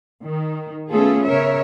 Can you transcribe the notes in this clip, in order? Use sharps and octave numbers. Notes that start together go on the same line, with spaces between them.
D#3
A3 B3 C#4 F4 G#4 A4
C#3 A#4 C#5 E5